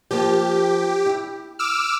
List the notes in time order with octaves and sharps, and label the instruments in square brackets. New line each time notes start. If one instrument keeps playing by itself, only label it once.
[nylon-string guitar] F3 A#3 [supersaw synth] G4
[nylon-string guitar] E4
[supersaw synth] D6 E6 F6